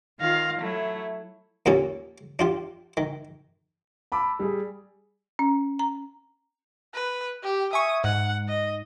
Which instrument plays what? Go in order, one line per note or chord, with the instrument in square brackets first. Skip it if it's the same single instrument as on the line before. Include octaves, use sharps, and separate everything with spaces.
[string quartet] D#3 F4 F5 A#6
F#3 A3 E4
[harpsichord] D#2 A#2 C#4 A4 C#6
D4 F4 G4
D#3
[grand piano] A5 B5 D6 E6
G3 G#4
[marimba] C#4
A#5
[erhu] B4
G4
[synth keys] E5 G#5 C#6 [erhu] D#6
[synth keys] G#2 [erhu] F#5
[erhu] D#5